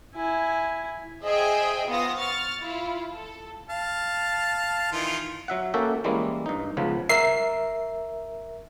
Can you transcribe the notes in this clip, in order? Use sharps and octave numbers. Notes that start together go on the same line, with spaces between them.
E4 G#5
G#4 C5 D#5 E5 G5 G#5
B3 F4 C5 F5 D#6 A#6
C#6 F6 A6
E4 F4
A4
F5 A5
D#3 E3 F4
F#3 E5 F#5
A#3 C#4 F#4 A4 E5 G5
E3 G3 G#3 A#3 C#4 E4
G2 D#4
C#2 C#3 F3 B3
A#4 E5 C7